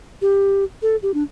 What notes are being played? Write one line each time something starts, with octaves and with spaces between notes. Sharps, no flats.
G4
A4
G4
D4